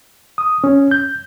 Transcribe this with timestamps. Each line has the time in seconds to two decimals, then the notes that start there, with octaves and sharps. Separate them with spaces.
0.38 D#6
0.64 C#4
0.91 G6